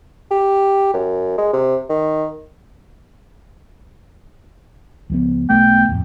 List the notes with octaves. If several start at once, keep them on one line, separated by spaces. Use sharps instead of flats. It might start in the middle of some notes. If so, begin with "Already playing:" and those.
G4
F#2
G#3
C3
D#3
C#2 F3 B3
B1 A3 B3 G5
D1 F2